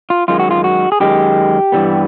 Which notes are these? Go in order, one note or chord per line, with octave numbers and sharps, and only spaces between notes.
F4
F#2 D#3 G#3 F4
F#4
F4
F#4
G#4
F#2 D#3 G#3 G4
G2 E3 G3 B3